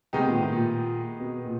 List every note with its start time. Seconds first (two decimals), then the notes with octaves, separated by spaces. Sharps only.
0.13 C3 D#3 G#3 B3 D#4 G4
0.27 A#2
0.39 A2
0.52 A#2
1.19 B2
1.45 A#2